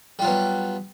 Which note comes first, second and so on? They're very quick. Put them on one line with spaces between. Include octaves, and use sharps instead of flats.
G3 F4 F#3 B3